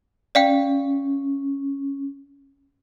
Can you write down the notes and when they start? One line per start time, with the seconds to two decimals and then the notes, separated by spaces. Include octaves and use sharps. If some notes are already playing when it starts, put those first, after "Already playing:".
0.35 C#4 D5 F5 G5